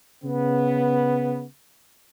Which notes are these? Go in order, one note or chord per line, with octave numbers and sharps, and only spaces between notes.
C#3 B3